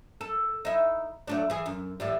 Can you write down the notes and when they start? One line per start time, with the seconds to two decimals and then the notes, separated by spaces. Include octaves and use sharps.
0.21 A4
0.65 D#4 E4
1.27 F#3 A3 D4
1.50 E3 G#4
1.66 F#2
2.00 A2 E3 G3